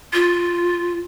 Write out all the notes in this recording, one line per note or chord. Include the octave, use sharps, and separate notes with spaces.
F4